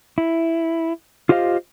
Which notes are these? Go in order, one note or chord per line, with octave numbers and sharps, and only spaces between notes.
E4
F4 G4 C5 D#5 F5